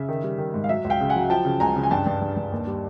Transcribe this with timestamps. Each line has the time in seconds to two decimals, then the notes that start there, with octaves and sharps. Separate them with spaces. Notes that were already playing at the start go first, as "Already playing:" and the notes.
Already playing: C#3 E5
0.09 D#3
0.24 G3
0.38 D#3
0.54 G#2
0.64 F5
0.69 F#3 E5
0.85 C#2
0.90 F5 G5
1.00 C#3
1.09 F#5 G#5
1.16 F#3
1.30 F3 G5 A5
1.45 C#3
1.60 C#2 G#5 A#5
1.76 C#3
1.83 G#5
1.91 G2 G5 A5
2.06 G2
2.21 G2
2.37 G2
2.52 D#2
2.67 G3